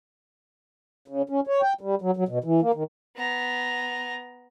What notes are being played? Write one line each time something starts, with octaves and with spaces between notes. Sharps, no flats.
C#3
C#4
C#5
G5
G3
F#3
F#3
B2
E3
A#3
D#3
B3 A#5